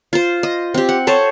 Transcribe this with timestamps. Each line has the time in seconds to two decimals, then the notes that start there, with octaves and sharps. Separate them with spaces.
0.13 F4 C5
0.43 D#5
0.74 C4 G4
0.89 F#5
1.07 A4 C5 C#5